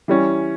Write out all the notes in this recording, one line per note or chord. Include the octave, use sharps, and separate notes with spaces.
E3 G3 C#4